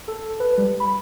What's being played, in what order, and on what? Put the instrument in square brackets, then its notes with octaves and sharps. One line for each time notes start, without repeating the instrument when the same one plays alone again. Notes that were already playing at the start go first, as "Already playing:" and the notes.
[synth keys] A4
B4
G3
B5